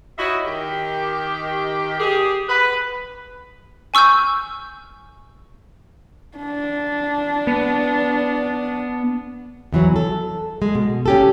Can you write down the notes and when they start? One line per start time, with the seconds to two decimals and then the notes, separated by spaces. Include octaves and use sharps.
0.18 D#4 E4 F#4 C#5 D#5 E5
0.46 D#3 G4
2.00 G4 G#4
2.49 B4
3.94 G#5 C#6 E6 F6 G6
6.38 D4
7.47 B3
9.73 E2 E3 F#3
9.96 A4
10.62 G#3
10.75 B2
11.06 C#4 G4 A4